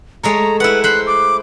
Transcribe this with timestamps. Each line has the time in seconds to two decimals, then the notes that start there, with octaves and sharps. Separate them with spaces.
0.24 G#3 A3 C#5 A#5
0.60 E4 B4 F#5
0.84 C5 B5 F#6
1.07 D6